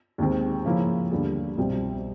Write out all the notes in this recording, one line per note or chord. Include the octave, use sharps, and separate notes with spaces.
D#2 D#3 G#3 C4
C#3 F3 A#3 C#4 E4
D#2 D3 G3 B3
C2 B2 G3 C4